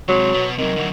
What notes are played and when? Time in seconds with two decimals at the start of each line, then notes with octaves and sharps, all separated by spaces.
0.09 C3 F#3 G#3
0.34 B2 B3
0.58 C3 D#3 F#3
0.76 D3 F#3